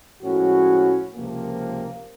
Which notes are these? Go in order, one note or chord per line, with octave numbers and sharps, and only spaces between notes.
A2 F3 G#3 C#4 F#4
C#2 C3 F3 A#3